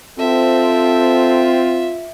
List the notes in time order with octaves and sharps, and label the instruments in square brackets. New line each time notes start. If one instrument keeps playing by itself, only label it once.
[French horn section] C4 [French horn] F4 [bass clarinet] A4 [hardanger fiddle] E5